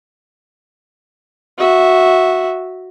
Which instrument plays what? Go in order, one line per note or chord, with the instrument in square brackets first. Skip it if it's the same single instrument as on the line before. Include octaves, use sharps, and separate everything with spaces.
[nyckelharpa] F#4 E5